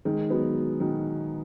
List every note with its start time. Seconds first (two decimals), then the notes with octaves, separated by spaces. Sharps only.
0.05 D#3 G#3
0.30 F#3 B3
0.80 B2 D#3